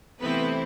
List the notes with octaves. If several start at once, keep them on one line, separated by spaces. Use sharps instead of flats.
C3 E3 A3 B3 C4 E4 B4